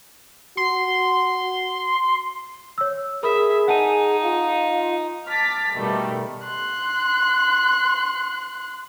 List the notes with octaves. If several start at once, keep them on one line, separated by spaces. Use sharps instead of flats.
F#4 C6
C#5 E6
G#4 A#4 E5 B5 D#6
D#4 F#5 G#5 A5 D#7
F4 F5
A5 D6 F6 A6 B6
B2 D#3 G3 A3
C6 F#6